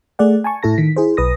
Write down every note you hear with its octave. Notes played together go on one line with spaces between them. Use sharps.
A3 G#4 D5 F#5
G#5 A5 C#6
A2 E4 A4 A5 A#6
D#3 B6
E4 G#4 C5
B1 B4 D#6 A#6